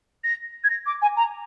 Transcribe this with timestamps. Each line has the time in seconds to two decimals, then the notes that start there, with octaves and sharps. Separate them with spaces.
0.24 A#6
0.64 G#6
0.70 A#6
0.86 D6
1.02 G#5
1.17 A#5